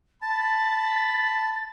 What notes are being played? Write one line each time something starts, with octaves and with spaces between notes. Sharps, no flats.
A5 B5 A6